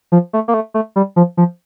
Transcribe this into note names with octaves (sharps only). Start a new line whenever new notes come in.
F3
A3
A#3
A3
A3
G3
F3
F3